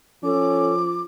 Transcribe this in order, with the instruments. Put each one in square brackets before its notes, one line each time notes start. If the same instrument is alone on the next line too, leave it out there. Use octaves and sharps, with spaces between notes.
[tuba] F3 [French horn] C#4 [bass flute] A4 [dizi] D6